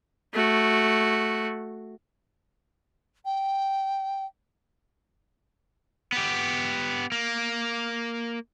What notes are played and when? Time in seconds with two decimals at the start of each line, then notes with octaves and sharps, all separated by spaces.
0.33 A3 F#4
3.25 G5
6.12 B3 G4
7.12 A#3